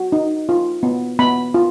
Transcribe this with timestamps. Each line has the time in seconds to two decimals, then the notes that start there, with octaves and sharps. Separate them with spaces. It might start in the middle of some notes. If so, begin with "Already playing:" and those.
Already playing: F#4
0.12 D#4
0.49 F4
0.83 B3
1.19 B3 B5
1.54 F4